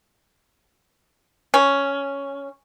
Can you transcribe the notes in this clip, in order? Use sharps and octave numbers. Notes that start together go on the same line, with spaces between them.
C#4